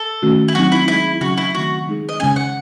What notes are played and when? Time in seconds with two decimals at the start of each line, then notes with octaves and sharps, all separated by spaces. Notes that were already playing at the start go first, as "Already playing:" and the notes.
Already playing: A4
0.22 D#3 A3 C#4 F#4
0.48 E4
0.55 F#3 C4 D#4 F#4
0.72 E4
0.88 G#3 D#4 E4 G#4
1.21 C#3 F#3 C#4 F#4
1.37 E4
1.55 D#3 A3 C4 F#4
1.88 G#3 D#4 G#4
2.09 D#5
2.20 C#3 G#3 C#4 G#5
2.36 F#5